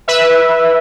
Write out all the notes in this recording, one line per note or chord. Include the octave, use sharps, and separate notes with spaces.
B4 E5